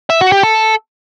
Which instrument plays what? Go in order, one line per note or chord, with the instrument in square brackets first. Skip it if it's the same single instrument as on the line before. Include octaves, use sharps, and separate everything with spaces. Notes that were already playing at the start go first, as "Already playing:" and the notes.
[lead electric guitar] E5
F#4
G4
A4